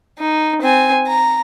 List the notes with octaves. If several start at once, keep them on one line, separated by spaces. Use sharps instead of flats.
D#4
C4 G#5
A#5